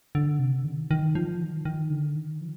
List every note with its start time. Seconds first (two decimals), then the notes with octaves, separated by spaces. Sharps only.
0.15 D3
0.39 C3
0.65 D#3
0.91 D#3
1.15 F3
1.41 D#3
1.65 D#3
1.90 D3
2.16 D#3
2.41 F3